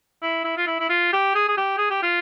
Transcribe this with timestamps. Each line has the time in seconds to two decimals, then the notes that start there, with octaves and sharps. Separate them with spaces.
0.22 E4
0.45 E4
0.57 F4
0.67 E4
0.80 E4
0.90 F4
1.13 G4
1.35 G#4
1.48 G#4
1.57 G4
1.78 G#4
1.90 G4
2.03 F4